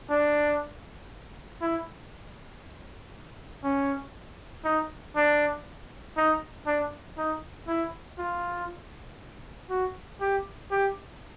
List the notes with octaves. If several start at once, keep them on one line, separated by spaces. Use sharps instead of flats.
D4
E4
C#4
D#4
D4
D#4
D4
D#4
E4
F4
F#4
G4
G4